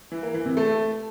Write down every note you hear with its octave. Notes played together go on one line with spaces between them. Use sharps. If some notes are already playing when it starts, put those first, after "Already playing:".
E3
A#3
E3
C3
A3